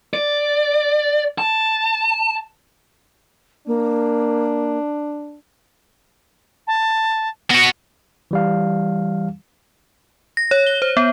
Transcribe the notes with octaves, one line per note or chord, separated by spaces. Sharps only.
D5
A5
A#3 D4
A5
B3 F#4 A#6
E3 G3 F5
A#6
C#5
G7
C5
B3